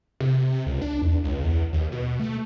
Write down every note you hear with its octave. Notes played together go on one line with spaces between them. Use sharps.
C3
C3
C#2
D4
E2
C#2
E2
D#2
B2
A3